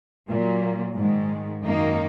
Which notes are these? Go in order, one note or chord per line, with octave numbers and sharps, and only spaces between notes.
A#2 F#3 A#3
G#2 D#3 G#3
F#2 D#3 A#3 D#4